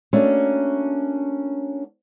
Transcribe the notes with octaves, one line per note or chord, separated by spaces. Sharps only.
A3 A#3 C#4 D4 F#4